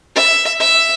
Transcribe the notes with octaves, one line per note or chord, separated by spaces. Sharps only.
E5
E5